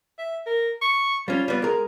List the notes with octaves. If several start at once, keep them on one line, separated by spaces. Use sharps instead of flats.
E5
A#4
C#6
G3 C#4 F4
G3 B3
G#3 A#4